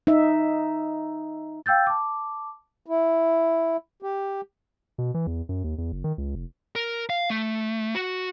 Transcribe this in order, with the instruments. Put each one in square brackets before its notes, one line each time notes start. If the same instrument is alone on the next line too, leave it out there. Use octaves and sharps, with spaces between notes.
[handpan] D#4 E5
[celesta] F5 G5 E6 G6 A6
A5 D6
[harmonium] E4
G4
[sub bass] B2
E3
E2
F#2
D#2
E2
F#1
D#3
C#2
F1
[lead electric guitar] A#4
F5
A3
F#4